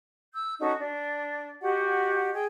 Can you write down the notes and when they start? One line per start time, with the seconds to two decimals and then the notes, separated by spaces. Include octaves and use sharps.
0.33 E6 G6
0.58 C#4 D#4 F#4 A4
0.79 D4
1.61 F#4 G4 D#5 F#5
2.33 G#4 G5